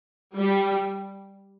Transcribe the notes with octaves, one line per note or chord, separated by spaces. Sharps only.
G3